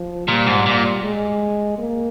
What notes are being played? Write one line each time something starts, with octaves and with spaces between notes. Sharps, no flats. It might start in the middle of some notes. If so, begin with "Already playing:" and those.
Already playing: F3
A#2 G3
G#2
A#2
G#3
A#3